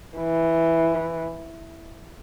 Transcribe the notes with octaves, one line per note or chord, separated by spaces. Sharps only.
E3